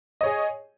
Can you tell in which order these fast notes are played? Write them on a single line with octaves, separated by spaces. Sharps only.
D#5 C#5 G#4